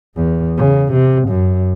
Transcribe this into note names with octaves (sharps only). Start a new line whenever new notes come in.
E2
C#3
C3
F#2